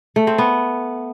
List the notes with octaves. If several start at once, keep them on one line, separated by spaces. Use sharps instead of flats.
A3
C4
B3